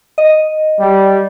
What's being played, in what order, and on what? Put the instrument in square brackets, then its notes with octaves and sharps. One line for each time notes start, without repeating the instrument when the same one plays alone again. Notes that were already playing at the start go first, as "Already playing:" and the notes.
[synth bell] D#5
[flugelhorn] G3